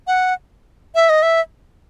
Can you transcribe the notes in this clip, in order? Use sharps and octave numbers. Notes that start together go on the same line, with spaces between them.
F#5
E5
D#5
E5